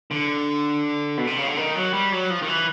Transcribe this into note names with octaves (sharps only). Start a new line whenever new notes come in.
D3
B2
C3
C#3
D3
D#3
F#3
G3
F#3
F3
D#3
E3